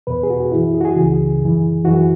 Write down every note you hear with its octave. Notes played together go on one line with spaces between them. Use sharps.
E2 B2 B4
G#4
F#4
F#2 E3 E4
G#4
F#4
G#4
C#2 C#3 E3
F#2 E3
F#2 E3 F#4